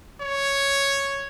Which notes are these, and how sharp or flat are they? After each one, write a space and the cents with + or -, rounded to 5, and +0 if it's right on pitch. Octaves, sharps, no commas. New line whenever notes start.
C#5 +0